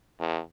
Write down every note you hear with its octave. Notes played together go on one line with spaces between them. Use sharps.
E2